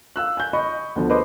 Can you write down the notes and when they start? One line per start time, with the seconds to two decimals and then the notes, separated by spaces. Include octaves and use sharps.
0.16 F5 E6 F#6
0.37 G#5 G6
0.53 D#5 B5 C#6
0.96 D2 B2 D3 F3
1.10 B4 C5 D#5 D6 D#6